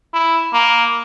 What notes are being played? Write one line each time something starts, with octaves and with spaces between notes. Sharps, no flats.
E4
A#3